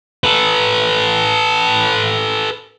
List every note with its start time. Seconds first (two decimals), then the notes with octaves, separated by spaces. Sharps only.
0.24 A4 B4